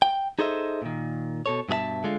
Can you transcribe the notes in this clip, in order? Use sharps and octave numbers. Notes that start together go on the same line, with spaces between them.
G5
D#4 G#4 A4 C5 D#5 E5
A#2 D#3
B2 A4 C#5
G2 B2 G#4 E5 A5
D3 G#3 F4